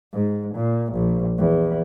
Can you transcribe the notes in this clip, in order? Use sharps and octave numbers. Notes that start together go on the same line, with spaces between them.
G#2
A#2
A#1
E2